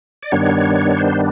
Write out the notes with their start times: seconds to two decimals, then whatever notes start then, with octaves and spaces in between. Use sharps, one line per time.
0.23 D5
0.32 G2 D#3 G3 B3 D4 C#5
0.98 C5